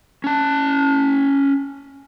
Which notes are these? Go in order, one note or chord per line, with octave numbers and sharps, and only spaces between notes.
C#4 A5